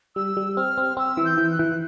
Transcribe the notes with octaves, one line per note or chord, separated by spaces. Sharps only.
G3 E6
G3
C4 F6
C4
C4 E6
E3
G6
E3
F#6
E3